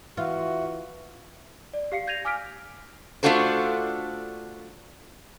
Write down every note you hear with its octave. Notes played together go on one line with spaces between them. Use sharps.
E3 F4 F#4 E5
D5
G4 F5 C7 C#7
G6 G#6 A#6 D#7 F7
G#5 D6 E6 F6 B6 D7
A3 D4 F4 F#4 A4 C5